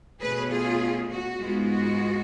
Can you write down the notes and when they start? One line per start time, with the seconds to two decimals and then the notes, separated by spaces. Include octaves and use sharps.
0.20 B2 A3 C#4 G#4 B4
0.50 F4 G#4
1.11 F#4
1.39 G#2 G#3 B3 F4
1.70 F#4